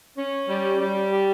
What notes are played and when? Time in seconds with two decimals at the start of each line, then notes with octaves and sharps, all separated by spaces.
0.17 C#4
0.48 G3
0.80 G3
1.12 G4